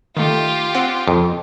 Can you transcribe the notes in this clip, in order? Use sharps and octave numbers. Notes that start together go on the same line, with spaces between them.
D#3 A3 F4 G4
C4 F#5 C6
F2